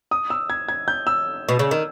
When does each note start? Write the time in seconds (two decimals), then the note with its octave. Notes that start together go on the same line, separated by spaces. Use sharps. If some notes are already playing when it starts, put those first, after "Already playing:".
0.11 D#6
0.30 E6
0.50 G#6
0.68 G#6
0.88 G6
1.07 E6
1.49 B2
1.59 C#3
1.71 D#3